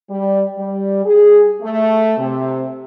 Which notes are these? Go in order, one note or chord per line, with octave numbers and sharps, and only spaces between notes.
G3
G3
G#4
A3
C3